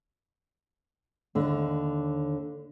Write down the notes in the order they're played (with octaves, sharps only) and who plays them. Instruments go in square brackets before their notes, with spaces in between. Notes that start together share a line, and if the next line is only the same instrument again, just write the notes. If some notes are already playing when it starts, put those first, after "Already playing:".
[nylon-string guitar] D#2 D3